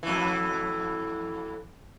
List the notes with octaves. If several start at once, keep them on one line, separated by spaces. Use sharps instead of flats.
F2 A2 E3